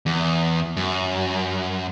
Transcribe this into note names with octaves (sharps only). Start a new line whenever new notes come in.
E2
F#2